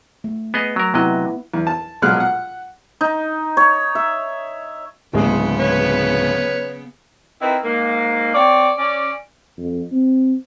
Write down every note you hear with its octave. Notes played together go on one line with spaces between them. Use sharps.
A3
B3 G#4 D#5
F#3 A#4
C3 F#3 B3 E4 D#5 F#5
E2
A5
A#1 B2 F#3 G#3 F6 F#6
F#5
D#4
C#5
E5
D1 C#3 G#3 B3 G#4
B4 C#5
C4 D#4 E4 A#4 B4
G#2 A#3
C4 C#5 D5
C#4 D5
F2
C4